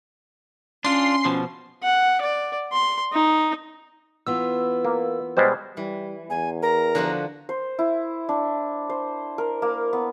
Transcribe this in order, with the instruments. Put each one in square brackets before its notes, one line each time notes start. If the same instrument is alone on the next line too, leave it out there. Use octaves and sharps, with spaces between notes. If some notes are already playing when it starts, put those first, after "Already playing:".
[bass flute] C#4 [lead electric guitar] D4 F4 [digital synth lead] C6
[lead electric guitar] B2 F3
[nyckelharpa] F#5
D5
C6
D#4
[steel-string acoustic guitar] E3 B3 F4 [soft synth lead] E6
[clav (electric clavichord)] A#3
[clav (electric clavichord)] B2 G3 G#3 [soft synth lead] C5
[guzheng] E3 [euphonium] G3
[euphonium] E2 [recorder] G#5
[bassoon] A#4 [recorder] A#5
[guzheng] D3 F3 F#4
[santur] C5
E4
D4
C5
A#4
A#3
B3